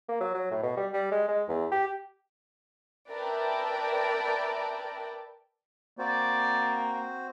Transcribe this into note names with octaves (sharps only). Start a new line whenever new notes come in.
A#3
F#3
F#3
A2
B2
G3
G3
G#3
G#3
E2
G4
A#4 B4 D5 E5 G5 A5
A#3 C4 F#4 C5 D5